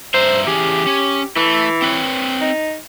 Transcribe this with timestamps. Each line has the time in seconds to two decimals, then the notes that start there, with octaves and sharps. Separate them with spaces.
0.14 G2 C5 E5 A#5
0.47 E3 C#4 G4 G#4
0.86 C#4
1.36 E3 A3
1.82 C4 B4 C#5
2.41 D#4